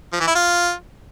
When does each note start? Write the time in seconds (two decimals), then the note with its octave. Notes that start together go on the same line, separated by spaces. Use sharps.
0.13 F3
0.20 E3
0.27 E4
0.35 F4